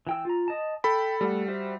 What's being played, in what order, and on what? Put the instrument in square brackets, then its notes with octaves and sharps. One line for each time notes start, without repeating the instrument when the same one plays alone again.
[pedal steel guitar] E3 G5 E6
F4 A#5
D#5 A5
[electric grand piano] A4 B5 [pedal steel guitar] G5
[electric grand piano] G3 [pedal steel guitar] A3 A4 F#5
[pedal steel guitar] F#4 C5 E5